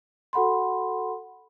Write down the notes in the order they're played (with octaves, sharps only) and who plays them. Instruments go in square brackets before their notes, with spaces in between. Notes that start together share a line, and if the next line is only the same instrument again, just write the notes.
[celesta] F#4 A4 F#5 B5 C6